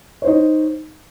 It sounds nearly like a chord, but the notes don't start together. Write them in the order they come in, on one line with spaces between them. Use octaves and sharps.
C#5 C5 D#4